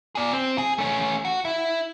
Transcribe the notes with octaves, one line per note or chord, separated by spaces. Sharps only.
G#4 D5
C4
G#4
A3 C#4
F#4
E4